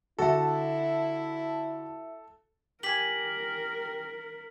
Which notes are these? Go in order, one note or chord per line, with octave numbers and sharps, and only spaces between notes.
D3 E4 F#4 A4 E5 A5
G4 A#4 G#5 B6 F#7